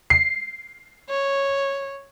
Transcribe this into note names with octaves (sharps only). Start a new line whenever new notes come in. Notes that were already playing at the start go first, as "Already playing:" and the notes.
C7
C#5